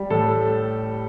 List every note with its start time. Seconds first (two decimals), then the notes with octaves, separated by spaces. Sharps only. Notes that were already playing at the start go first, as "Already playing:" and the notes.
Already playing: G3
0.10 A2 A4